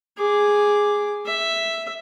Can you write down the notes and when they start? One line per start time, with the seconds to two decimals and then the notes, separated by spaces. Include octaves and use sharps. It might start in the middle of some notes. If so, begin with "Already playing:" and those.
0.18 G#4 D6
1.26 E5